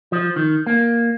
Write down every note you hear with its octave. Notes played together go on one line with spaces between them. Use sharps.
F3
D#3
A#3